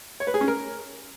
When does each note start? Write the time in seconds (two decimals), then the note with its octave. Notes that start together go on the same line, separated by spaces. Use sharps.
0.20 C#5
0.27 B4
0.34 G#4
0.41 C#4
0.48 A#4